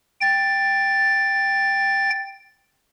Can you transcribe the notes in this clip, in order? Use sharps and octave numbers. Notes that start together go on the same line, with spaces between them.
G5 A6